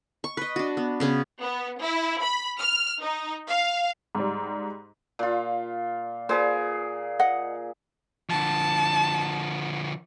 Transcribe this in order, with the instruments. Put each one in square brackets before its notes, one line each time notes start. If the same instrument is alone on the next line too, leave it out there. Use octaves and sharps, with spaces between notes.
[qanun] C#6
B4 D#5
D4 F#4
B3
C#3 B3 C#4
[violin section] B3
E4
B5
F6
D#4
F5
[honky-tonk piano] G#2 G3
[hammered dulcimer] A#2 F4
[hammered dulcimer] A#2 G#4 [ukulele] B4 C5
[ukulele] D#5 F#5
[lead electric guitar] D3 F3 [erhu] A5